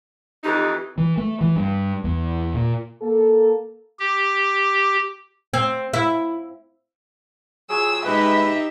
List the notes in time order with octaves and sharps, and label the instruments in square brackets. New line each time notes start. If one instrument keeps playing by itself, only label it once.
[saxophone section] F2 E3 D#4 [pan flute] G4
[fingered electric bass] E3
A3
E3
G2
E2
A#2
[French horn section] A#3 A4
[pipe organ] G4
[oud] C4
E4
[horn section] F#3 F4 G#4 [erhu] E6
[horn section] G#3 B4 [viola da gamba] D#4 G4 [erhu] E5